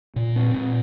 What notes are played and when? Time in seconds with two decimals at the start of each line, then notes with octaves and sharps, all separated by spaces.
0.16 A#2
0.36 C4
0.54 A#2